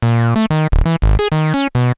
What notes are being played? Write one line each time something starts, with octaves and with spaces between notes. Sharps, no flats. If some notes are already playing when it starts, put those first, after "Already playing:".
A#2
A3
D#3
D1
E3
G#1
G#4
D#3
C#4
B2